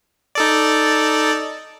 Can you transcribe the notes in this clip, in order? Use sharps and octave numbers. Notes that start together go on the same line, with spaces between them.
D#4 A4 D5